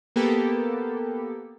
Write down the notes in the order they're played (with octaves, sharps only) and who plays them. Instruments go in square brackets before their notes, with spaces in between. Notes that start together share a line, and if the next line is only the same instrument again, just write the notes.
[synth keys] A#3 B3 G4 A4